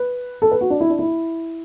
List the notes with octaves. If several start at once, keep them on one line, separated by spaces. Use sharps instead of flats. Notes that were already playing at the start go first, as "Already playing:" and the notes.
Already playing: B4
A4
B4
F#4
D4
E4
D4
E4